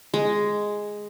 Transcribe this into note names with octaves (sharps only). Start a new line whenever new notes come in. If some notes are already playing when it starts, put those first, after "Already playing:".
G#3